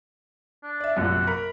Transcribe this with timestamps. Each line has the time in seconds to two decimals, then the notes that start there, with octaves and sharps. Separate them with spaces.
0.63 D4
0.80 D5 E5
0.96 A#1 F#2 C3 F#5
1.27 A#4 B5